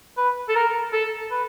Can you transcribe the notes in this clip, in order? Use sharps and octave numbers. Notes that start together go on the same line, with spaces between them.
B4
A4
A#4
A4
B4